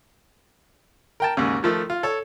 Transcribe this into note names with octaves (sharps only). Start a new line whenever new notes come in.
A#4 G5 A5
D#2 G#2 C#3
D#3 F3 A3
F4
A4 C#5